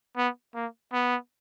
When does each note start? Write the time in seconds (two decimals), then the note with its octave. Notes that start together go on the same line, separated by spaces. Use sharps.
0.17 B3
0.55 A#3
0.93 B3